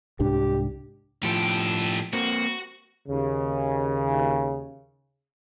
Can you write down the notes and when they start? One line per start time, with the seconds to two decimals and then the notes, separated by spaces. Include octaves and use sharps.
0.20 C2 G#2 D4 G4
1.23 A2 F3 G4 A4
2.13 A#3 C4 F#4
3.08 D#2 C#3